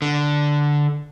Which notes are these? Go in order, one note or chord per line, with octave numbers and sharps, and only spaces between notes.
D3